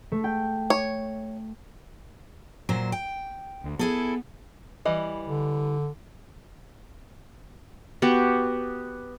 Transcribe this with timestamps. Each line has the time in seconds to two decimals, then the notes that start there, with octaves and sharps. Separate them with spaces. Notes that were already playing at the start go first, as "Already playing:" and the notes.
0.12 A3
0.24 G5
0.70 C#5
2.69 A#2 F#3 C5
2.92 G5
3.64 D2
3.79 B3 E4 G#4 A4
4.85 E3 G3 D#5
5.27 D3
8.02 B3 F#4 G4 B4